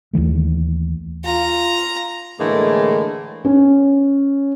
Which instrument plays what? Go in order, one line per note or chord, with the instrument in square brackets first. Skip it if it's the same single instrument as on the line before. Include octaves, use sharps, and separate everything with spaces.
[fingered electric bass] D#2 D#3 E3 A3
[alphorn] F4 [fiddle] A#5
[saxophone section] A2 D3 E3 G#3 A#3
[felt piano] C#4